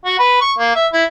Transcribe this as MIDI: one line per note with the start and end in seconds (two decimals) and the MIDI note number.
0.05 0.16 66
0.19 0.40 71
0.41 0.52 85
0.58 0.73 58
0.75 0.86 76
0.93 1.04 64